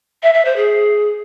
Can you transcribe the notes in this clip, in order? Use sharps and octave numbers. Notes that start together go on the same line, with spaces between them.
E5
E5
C5
G#4